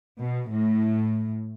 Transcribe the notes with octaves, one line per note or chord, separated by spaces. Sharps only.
B2
A2